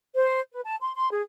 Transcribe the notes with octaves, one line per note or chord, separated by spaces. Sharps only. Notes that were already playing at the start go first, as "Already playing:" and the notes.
C5
B4
A5
C6
C6
G#4